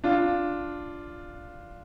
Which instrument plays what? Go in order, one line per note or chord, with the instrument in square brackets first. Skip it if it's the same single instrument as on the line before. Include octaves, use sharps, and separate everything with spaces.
[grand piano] D4 F4